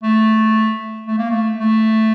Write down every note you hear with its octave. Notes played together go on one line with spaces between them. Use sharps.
A3
A3
A#3
A3
A3